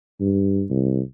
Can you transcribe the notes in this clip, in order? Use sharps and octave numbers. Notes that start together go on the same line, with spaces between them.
G2
C2